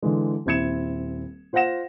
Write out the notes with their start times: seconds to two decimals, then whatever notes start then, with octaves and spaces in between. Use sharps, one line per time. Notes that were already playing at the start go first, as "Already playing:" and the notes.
0.03 D3 E3 G#3
0.46 D#1 C4 E4 G#6 C#7 E7
1.53 F4 C5 F5 F#5 A#6 E7